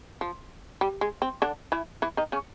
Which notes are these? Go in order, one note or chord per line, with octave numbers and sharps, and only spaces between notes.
F3
G3
G#3
C4
D3 D4
E3 E4
E3 E4
D#3 D#4
C#3 C#4